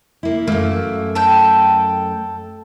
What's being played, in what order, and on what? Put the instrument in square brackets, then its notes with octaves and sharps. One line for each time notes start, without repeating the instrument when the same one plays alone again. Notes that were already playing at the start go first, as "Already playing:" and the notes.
[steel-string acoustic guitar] A#3 E4
[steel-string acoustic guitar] F#2 A3 [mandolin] A#3
[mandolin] A4 G5